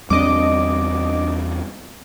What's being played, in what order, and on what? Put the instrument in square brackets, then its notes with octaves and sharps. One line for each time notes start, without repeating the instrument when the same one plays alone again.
[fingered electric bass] E2 G3 C4 [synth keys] D4 D#5 D6